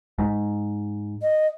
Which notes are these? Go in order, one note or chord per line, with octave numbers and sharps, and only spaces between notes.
G#2
D#5